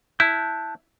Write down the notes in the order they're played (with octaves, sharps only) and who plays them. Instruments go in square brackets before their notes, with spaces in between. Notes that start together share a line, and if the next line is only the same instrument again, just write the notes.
[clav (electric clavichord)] E4 [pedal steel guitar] A5 F#6 G6